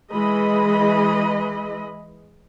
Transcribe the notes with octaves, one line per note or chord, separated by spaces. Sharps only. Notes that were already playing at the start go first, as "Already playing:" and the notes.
E3 G#3 G#4 D#5 B5